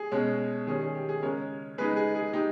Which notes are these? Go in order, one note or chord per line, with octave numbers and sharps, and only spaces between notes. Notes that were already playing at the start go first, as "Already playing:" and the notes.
Already playing: G#4
B2 G#3 C#4
D#3 G3 C#4 G#4
G#4
G4
G#4
C#3 G#3 C#4 A#4 C#5
C#3 G#3 D#4 G#4 B4
G#4
G#4
G#3 D#4 G4